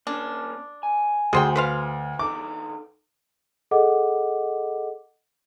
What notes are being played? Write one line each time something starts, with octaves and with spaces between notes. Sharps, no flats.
A#3 C#4 D4
G#5
D2 G#4 C5 G5
B4 C5 F5
E3 D#4 A4 D6
G#4 A4 D#5 F#5 D6